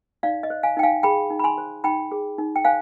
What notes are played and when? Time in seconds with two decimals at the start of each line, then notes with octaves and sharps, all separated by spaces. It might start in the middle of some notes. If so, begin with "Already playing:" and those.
0.23 D#4 D5 F5
0.43 D#5
0.50 C5
0.63 F5 G#5
0.77 D#4 G5
0.83 F5 G#5
1.03 G#4 G5 B5
1.30 D#4
1.40 B5
1.44 G#5 C6
1.58 C5
1.84 D#4 G5 B5
2.12 G#4
2.38 D#4
2.56 G5
2.65 C5 F5 G#5